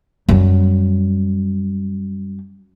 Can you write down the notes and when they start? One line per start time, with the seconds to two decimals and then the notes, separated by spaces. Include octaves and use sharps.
0.29 F#2 G3